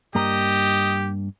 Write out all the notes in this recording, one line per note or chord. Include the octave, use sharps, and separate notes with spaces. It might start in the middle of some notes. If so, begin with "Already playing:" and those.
G2 A#3 G4 D#5 A#5